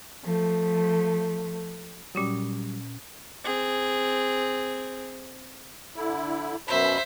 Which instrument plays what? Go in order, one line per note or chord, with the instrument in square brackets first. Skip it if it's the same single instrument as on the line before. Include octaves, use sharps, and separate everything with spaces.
[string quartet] F3 A3
[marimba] A#2 C#4 D#6 [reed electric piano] F#3 G3
[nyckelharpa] C4 G#4
[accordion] D3 E4
[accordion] F#2 B2 B5 [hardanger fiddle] C5 E5